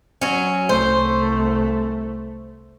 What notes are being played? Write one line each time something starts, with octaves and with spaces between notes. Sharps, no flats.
F#3 C#4
C2 A3 C5